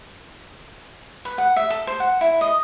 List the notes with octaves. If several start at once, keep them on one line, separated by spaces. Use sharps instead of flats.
B4
F#5
E5
A4
C5
F#5
E4
D#5